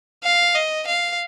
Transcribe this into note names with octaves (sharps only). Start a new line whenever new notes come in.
F5
D#5
F5